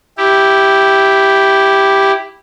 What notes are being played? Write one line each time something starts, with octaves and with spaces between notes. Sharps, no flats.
E4 G4